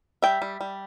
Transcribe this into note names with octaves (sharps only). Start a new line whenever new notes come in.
G3 E5 G5
G3
G3